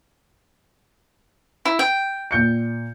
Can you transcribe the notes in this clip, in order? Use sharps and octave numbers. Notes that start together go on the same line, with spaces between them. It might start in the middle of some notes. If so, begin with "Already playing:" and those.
E4
G5
A#2 G6 C#7